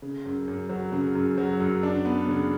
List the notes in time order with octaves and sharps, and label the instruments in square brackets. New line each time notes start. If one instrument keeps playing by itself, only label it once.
[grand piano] C#3
F#2
F#2
F#3
C#3
F#2
F#3
F#2
D4
B3
C#3